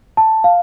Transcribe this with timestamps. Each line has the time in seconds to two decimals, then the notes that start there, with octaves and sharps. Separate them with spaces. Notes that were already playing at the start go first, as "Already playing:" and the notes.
0.17 A5
0.44 F5